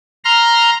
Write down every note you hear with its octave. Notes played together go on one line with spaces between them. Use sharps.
A#5 C6 F6